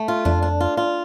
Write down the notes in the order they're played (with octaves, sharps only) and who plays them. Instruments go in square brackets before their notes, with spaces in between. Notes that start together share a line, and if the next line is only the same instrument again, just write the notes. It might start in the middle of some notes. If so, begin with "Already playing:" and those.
Already playing: [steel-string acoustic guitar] A3
F4
[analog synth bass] F2 [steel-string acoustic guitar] D4
[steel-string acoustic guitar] D4
F4
F4